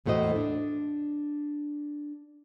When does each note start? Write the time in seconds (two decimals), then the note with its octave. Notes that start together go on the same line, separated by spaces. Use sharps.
0.06 E2 A2 A3 F#4 C5 D#5
0.36 D4